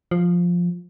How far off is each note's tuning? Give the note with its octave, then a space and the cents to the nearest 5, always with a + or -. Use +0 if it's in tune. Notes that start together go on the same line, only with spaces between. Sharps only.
F3 +5